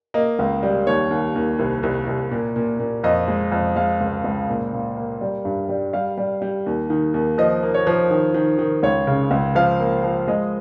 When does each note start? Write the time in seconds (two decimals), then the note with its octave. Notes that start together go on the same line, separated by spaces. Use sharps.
0.14 A#3 D#5
0.39 C#2
0.63 G3
0.87 D#2 C#5
1.11 D#2
1.36 D#2
1.59 C2
1.83 C2
2.07 C2
2.31 A#2
2.56 A#2
2.80 A#2
3.04 F2 D#5
3.28 G#3
3.52 F2
3.76 G#3 F5
4.01 C#2
4.24 C#2
4.49 A#2
4.73 A#2
4.97 A#3
5.21 G3
5.45 G2
5.69 G3
5.93 G3 F5
6.18 G3
6.42 G3
6.66 D#2
6.90 D#3
7.14 D#2
7.38 F3 D#5
7.63 A#3
7.74 C#5
7.87 F3
8.11 D#3
8.34 D#3
8.59 D#3
8.83 C#2 C#5
9.07 C#3
9.31 C#2
9.55 F3 F5
9.79 A#3
10.04 F3
10.28 G#3 D#5